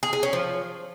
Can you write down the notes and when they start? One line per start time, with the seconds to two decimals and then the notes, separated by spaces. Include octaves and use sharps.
0.03 G#4
0.13 G#4
0.23 C#4
0.33 F3